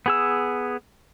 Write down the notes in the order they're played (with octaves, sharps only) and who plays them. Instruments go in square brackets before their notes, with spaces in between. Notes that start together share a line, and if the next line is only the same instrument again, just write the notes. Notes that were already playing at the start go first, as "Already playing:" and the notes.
[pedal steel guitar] B3 G#4 E6